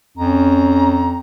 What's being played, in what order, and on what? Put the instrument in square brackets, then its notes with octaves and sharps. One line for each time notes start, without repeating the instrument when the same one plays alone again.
[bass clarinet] F2 [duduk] C#4 [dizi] A#5